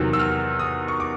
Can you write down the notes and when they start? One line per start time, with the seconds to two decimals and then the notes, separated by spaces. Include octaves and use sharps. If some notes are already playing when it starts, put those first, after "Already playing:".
Already playing: E2 C3 D#3 F#3 E6
0.13 E6
0.19 F6
0.59 D#6
0.88 C#6
1.00 D6